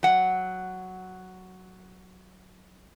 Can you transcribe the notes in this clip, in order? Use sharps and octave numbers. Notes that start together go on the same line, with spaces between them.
F#3 F#5